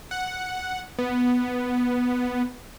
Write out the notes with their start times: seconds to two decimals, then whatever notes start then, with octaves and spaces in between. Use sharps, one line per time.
0.11 F#5
0.99 B3